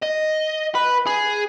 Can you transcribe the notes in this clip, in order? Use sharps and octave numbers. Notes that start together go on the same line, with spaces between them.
D#5
B4
G#4